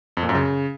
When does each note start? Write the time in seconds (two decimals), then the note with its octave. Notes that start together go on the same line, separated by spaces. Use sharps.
0.17 F2
0.23 A#2
0.29 F#2
0.35 C#3